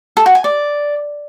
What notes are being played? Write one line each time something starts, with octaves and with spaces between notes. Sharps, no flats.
A4
F#4
G#5
D5